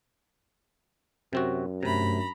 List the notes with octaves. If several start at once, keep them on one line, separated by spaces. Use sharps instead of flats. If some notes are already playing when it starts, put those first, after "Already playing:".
F#2 C3 C4 F#4
G2 C3 A3 A#5 B5